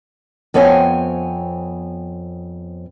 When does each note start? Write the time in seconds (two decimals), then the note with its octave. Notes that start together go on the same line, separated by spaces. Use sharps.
0.54 F2 B3 C4 C#5 G5 G#5